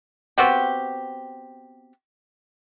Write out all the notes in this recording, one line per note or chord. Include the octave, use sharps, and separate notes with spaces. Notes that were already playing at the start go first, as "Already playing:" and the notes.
B3 C4 F#4 G4